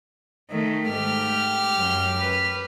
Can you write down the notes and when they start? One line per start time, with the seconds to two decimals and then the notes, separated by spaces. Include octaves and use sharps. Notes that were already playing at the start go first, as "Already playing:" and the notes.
0.50 D#3 A3
0.90 G#2 A3 G4 F6
1.78 F#2
2.20 B4